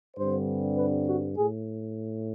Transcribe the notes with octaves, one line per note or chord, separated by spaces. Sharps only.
G2 D3 G3 C4 C5
B4
F#4
A2 G#4